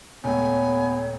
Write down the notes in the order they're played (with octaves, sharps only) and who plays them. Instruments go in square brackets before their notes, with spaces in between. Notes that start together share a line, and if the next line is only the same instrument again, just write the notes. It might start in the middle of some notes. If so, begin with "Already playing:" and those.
[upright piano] D#1 C#2 A3 [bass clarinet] B3 [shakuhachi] C#5 [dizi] G#5